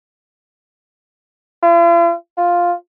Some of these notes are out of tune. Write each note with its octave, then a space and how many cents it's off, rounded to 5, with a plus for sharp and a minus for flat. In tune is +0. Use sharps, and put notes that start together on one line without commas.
F4 -45
F4 +5